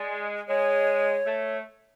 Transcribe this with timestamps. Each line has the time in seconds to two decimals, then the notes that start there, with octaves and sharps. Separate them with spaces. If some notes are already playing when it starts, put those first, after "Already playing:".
Already playing: G#3 D5
0.48 G#3 C#5
1.26 A3